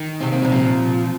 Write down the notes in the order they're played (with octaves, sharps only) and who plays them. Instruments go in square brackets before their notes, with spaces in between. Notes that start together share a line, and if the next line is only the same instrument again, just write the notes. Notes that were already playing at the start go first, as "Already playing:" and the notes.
Already playing: [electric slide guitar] D#3
[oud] C3 [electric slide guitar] C4
[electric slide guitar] A#3
[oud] C3 [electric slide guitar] G3
[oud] A#2 [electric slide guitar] F3